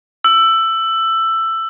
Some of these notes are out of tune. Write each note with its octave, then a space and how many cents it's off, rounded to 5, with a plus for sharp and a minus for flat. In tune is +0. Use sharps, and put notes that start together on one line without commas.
E6 +15